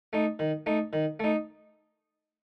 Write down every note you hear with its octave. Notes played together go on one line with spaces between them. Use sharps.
A3 D#4
D#3
A3 D#4
D#3
A3 D#4